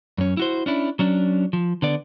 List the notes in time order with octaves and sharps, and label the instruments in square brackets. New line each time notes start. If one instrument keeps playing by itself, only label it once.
[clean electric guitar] F#2 C#4
E4 F#4 C5
C#4 D4 E4
F#3 C#4 D4
F3
D3 B3 D5